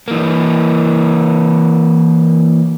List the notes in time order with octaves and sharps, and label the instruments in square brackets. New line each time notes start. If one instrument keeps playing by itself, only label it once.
[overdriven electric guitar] E3 A#3